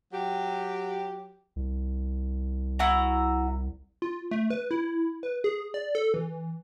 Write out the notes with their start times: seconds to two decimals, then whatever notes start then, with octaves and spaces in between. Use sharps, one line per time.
0.13 F#3 G4
1.56 C2
2.79 E4 F#4 A#5
4.02 F4
4.31 A3
4.50 B4
4.71 E4
5.23 B4
5.44 G#4
5.74 D5
5.95 A4
6.14 E3